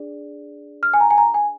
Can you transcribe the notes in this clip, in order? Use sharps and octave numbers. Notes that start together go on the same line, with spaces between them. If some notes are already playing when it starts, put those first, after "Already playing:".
Already playing: D4 G#4 D5
F6
G#5
A#5
G#5
A#5
G#5